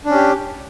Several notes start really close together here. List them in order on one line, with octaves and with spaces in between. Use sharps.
D4 C#4 G4